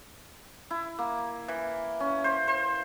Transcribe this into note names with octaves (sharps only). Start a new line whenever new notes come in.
E4
A#3
E3
C#4
C5
C5